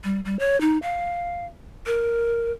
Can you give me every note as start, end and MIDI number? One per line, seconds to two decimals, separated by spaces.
0.04 0.20 55
0.25 0.37 55
0.39 0.59 73
0.61 0.78 63
0.82 1.45 77
1.86 2.52 70